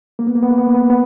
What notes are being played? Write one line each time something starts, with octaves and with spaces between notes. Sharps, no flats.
A#3
B3
A#3
B3
A#3
B3
A#3
B3
A#3
B3